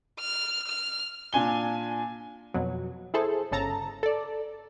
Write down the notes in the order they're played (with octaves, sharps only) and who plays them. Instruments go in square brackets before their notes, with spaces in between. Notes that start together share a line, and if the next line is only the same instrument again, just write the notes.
[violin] F6
F6
[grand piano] A#2 D4 G#5 G7
[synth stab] F2 B2 F#3
E4 G#4 A4 C5
G1 C#3 A4 A5 A#5
A4 D5